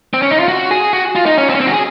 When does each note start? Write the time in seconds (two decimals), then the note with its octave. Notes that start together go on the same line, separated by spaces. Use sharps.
0.14 C4
0.22 C#4
0.31 D#4
0.39 F4
0.48 F#4
0.71 G#4
0.93 F#4
1.15 F4
1.26 D#4
1.38 C#4
1.49 C4
1.55 C#4
1.60 C4
1.67 F#4
1.72 G#4